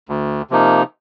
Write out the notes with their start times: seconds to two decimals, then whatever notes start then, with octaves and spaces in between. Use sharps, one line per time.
0.09 D2
0.50 C3 F3 A#3 D#4